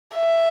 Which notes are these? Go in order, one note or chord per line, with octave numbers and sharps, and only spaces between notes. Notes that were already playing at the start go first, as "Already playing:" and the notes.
E5